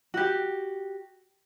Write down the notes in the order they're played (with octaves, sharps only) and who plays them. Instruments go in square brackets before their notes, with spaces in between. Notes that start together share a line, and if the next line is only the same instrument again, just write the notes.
[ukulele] F#4 G4